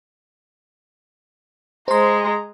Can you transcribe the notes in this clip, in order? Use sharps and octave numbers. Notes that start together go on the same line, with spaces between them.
G#3 C5 A#5 C6